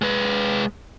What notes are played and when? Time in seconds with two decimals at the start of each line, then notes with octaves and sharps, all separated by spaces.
0.02 G#3 B4